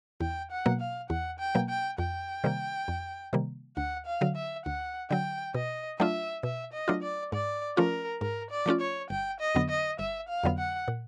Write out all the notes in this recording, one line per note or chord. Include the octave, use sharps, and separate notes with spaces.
E2 G5
F#5
B2 F#3 A#3
F5
E2 F#5
G5
B2 F#3 A#3
G5
F2 G5
C3 D#3 G3 A#3
F2
C3 D#3 G3 A#3
D2 F#5
F5
D3 F#3
E5
D2 F#5
D3 F#3 G5
B2 D#5
F#3 A3 D4 F4 E5
B2 E5
D#5
F#3 A3 D4 F4
D5
G#2 D5
F3 A3 C#4 F4 A#4
G#2 A#4
D5
F3 A3 C#4 F4
C#5
G1 G5
D#5
F2 D3 F#3 B3
D#5
G1 E5
F5
F2 D3 F#3 B3
F#5
A#2